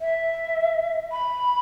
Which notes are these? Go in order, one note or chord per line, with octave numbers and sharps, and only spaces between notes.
E5
B5